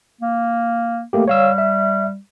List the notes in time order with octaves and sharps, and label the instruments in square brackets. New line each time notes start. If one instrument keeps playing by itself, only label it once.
[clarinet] A#3
[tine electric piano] A3 A#3 G4
[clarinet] G3 [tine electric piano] C#5 F5 E6
[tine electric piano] E5